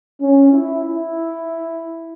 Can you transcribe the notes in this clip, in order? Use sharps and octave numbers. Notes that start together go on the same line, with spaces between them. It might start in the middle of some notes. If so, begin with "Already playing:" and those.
C#4
E4
E4